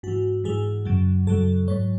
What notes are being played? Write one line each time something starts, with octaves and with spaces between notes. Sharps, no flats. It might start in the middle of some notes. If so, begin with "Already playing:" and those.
G#2 E3 F#4
G#2 E3 G#4
F#2 C#3 F#3
F#2 C#3 F#3 A4
G#2 F#3 C#5